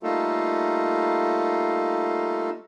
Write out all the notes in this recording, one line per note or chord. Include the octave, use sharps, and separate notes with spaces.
G3 A3 A#3 D#4 F4 A4